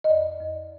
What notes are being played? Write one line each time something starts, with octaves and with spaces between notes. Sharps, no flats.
D#5
F2 D5
F2